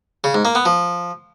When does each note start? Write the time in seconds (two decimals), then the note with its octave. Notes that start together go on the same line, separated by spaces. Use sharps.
0.24 C#3
0.34 G#2
0.45 A#3
0.55 B3
0.65 F3